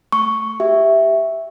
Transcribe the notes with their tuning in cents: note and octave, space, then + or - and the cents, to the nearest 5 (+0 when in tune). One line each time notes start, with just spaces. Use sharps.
A3 +0 C#6 +0
G4 +5 E5 +0